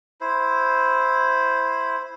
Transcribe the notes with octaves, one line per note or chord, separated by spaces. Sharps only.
E4 C5